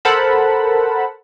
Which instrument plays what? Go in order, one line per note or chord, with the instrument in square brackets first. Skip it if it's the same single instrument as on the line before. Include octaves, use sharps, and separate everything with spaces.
[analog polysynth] A4 A#4 C5 F#5 A5 B5